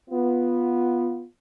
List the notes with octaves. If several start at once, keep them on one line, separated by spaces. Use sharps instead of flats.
B3 F4